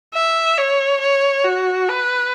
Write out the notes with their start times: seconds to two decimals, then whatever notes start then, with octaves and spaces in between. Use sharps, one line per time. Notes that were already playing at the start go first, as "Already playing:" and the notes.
0.14 E5
0.57 C#5
1.01 C#5
1.44 F#4
1.89 B4